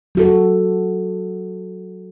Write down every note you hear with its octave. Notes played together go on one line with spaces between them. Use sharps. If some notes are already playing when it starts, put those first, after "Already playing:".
F#3 F#4 A4